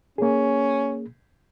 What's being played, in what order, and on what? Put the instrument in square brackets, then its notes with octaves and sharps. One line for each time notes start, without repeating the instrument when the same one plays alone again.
[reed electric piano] A#3 G#4 [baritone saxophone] C#4